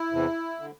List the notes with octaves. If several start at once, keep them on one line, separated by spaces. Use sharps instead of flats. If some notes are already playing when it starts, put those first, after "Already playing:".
Already playing: E4
E2 C3 E3
D3